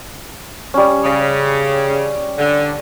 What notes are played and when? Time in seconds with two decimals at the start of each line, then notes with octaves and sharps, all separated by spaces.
0.74 G3 C#4
1.03 C#3
2.38 D3